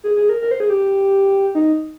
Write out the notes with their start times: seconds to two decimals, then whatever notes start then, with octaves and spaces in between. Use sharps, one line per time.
0.04 G#4
0.16 G#4
0.29 A#4
0.42 A#4
0.51 C5
0.60 G#4
0.70 G4
1.55 D#4